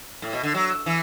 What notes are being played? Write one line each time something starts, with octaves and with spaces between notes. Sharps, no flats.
A2
B2
D3
F#3
E3